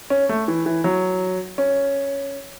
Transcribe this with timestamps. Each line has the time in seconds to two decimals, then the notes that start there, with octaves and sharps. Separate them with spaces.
0.10 C#4
0.29 A3
0.48 E3
0.66 E3
0.84 F#3
1.58 C#4